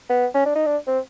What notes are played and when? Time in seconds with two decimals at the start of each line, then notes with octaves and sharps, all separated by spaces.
0.10 B3
0.35 C#4
0.46 D4
0.55 D#4
0.66 D4
0.87 C4